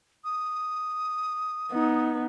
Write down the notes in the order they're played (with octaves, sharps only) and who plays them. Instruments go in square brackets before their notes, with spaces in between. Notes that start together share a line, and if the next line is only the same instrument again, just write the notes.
[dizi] D#6
[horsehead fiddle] B3 D#4